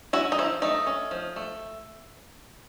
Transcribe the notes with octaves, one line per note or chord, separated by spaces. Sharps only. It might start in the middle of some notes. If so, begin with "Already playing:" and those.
C#4 E4 F#4
D#4
F3 E4
A3 D#4
C#4
F3
A3